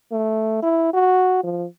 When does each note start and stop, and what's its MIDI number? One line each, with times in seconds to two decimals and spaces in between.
0.12 0.61 57
0.62 0.91 64
0.94 1.39 66
1.43 1.66 53